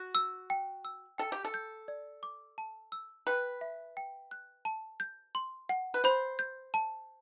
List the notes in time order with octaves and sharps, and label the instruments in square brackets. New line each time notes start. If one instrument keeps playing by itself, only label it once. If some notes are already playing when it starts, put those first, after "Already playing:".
Already playing: [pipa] F#4
[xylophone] E6
G5
E6
[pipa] A4 [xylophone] G5
[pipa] G4
A4
[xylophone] G6
D5
D6
A5
E6
[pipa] B4 [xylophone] G5
[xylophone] E5
G5
F#6
A5
G6
C6
F#5
[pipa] B4
[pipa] C5 [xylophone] B5
[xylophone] G6
A5